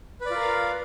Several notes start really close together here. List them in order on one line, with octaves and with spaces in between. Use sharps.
B4 D5 F4 A#4 F5